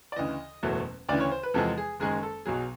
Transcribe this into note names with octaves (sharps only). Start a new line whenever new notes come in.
D5
D2 C#3 E3 D#5
F#1 E2 B2 F#3 A3
D2 C#3 E3 D5
C#5
C5
B4
E2 C3 F3 G#3 A4
G#4
F#1 F#2 D#3 G#3 G#4
A4
B1 B2 F#3 G#4